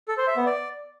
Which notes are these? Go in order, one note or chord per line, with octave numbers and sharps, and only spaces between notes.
A4
C5
E5
B3
D5